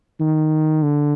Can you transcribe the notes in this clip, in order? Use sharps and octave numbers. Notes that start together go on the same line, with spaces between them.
D#3
D3